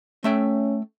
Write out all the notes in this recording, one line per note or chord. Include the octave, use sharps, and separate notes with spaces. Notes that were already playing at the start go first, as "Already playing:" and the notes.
A3 C#4 E5 G5